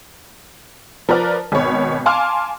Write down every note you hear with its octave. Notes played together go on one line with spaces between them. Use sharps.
F3 A#4 B4 D5 F6
G#1 B2 C#5 B5
F5 G#5 A5 C6 D6 F6